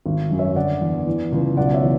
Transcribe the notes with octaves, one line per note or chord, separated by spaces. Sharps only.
G#1
F#2
C#5 E5
D3 D5 F#5
E2
E3
C#2
B1 D5 F#5
C#5 E5
E3